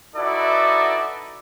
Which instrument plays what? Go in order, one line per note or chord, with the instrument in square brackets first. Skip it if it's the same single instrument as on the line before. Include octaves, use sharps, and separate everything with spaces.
[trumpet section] D#4 E4 F#4 A4 B4 D5